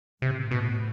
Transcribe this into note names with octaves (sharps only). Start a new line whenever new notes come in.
A2 C3
B2